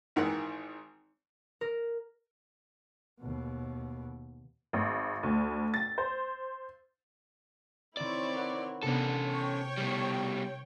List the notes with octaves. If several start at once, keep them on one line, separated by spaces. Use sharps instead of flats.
G#1 D#3 E3 F#5
A#4
D#2 B2
G#1
D2
A6
C5
D#3 C4 E4 C#5 D5 E7
A#4 B4 F#5
C3 B3 C#4 D4 A4
C#5 G5
B2 G3